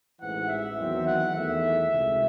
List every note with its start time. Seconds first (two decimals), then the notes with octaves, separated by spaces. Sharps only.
0.20 A1 G#2 E3 F#5
0.48 E5
0.77 E2 D#3 F#3 C4
1.06 F#5
1.35 E2 D#3 A3 E5
1.93 C#2 C3 D#3 A3